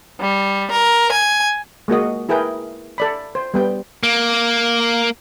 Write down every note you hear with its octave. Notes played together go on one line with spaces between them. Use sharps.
G3
A#4
G#5
G#3 A#3 F#4 D#5
E4 G#4 A#4 B4 G5
A4 D5 B5
C5
G3 B3 G5
A#3